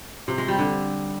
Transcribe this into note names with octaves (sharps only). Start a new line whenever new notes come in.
C3
G#3
G3
D3